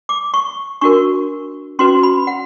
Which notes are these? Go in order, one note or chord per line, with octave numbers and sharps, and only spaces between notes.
D6
C#6
D4 F#4 A#4 C#6
C#4 F#4 B4 C6
B5
F#5